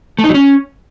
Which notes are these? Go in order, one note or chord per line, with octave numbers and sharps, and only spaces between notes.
A3
D#4
F#3
C#4